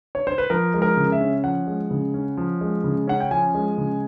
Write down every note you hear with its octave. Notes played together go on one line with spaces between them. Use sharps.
C#5
C5
B4
F3 A#4
G#3
A#4
C#3
E5
C#4
F3 F#5
G#3
C#3
C#4
F3
G#3
C#3
C#4 F#5
G5
F3 G#5
G#3
C#3